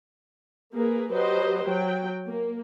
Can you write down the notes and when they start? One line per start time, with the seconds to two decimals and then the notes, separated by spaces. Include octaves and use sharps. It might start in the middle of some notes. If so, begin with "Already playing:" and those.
0.74 A#3 G#4 A#4 B4
1.14 F#3 G4 B4 C5 D#5
1.67 F#3 G5
2.28 A#3